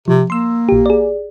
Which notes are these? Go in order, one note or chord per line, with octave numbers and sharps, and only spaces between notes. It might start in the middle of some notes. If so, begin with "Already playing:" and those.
C3 F3
A#3 C6 E6
A#1 G4
G#4 D5